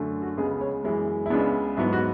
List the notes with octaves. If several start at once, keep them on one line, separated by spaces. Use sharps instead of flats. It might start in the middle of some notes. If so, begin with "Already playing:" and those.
Already playing: F#2 D3 A3
F#4
C#2 C#3 G#3 B3 G#4
C#5
F#2 E3 G#3 B3 E4
E4
C#2 C#3 G#3 B3 D4
G#2 F#3 B3 E4
F#4